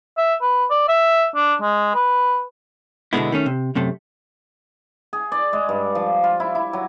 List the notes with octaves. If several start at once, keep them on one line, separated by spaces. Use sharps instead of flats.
E5
B4
D5
E5
D4
G#3
B4
B2 D3 D#3 G#3 B3 E4
D#3 A3 C#4
C3
F#2 C3 A3
G#4
D5
G#3
G2
F3
F4
E4
E4
F#3